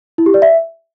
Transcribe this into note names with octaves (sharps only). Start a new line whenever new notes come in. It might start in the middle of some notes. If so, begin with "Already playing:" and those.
E4
G4
D5
E5